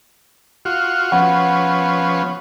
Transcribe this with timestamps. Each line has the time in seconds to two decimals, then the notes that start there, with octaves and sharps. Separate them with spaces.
0.65 F4 F#4
1.12 F3 B3 C#4 F#5